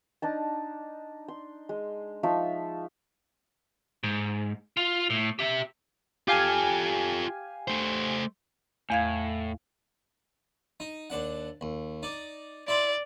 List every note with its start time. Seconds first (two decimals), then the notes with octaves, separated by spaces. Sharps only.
0.22 D4 D#4 A5
1.28 C6
1.69 G#3
2.23 F3 D#4 E5 C#6
4.03 G#2
4.77 F4
5.10 A2
5.39 G4 E5
6.28 F4 G4 A4 F5 G#5
7.68 A3 C5
8.90 E2 A2 F5 G#6
10.80 D#4
11.10 D#2 D4 F#5
11.61 D#2
12.03 D#4 D5
12.68 E4 D5 B5 C6